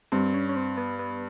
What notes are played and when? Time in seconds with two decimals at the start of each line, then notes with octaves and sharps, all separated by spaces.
0.12 G2 C4
0.34 C#4
0.49 C#4
0.56 C4
0.77 B3
0.99 B3